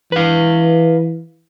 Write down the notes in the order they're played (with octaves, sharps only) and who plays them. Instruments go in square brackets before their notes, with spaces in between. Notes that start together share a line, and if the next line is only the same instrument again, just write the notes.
[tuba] E3 [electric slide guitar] B4 F5